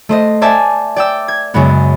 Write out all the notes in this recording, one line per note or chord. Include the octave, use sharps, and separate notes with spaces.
A3 C5 D#5
C5 D5 E5 G#5 A5
D5 G5 E6
G#6
F#2 C#3 G#3 B3